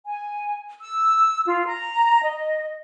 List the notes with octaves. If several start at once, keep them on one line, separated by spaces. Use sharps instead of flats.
G#5
E6
F4
A#5
D#5